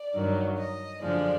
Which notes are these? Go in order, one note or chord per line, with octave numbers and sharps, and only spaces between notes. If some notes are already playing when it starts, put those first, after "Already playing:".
Already playing: D5
G2 D#3 F#3
D#5
F#2 D3 F3 G#3 D5